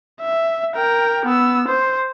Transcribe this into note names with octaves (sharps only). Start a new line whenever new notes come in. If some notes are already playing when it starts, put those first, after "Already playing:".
E5
A#4 G5
B3 E6
C5